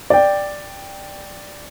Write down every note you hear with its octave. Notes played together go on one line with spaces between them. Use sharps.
D5 G5